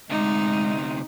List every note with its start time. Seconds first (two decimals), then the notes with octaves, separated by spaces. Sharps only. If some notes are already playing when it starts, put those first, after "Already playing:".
0.10 D2 C3 G#3 D#4